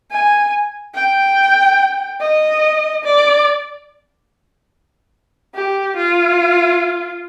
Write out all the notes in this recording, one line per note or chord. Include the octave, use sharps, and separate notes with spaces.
G#5
G5
D#5
D5
G4
F4